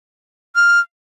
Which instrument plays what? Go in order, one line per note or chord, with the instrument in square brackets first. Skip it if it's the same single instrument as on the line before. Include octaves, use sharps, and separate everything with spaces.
[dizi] F6